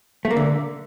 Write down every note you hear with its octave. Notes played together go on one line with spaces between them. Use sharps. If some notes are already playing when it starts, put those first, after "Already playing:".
A3
A#3
D3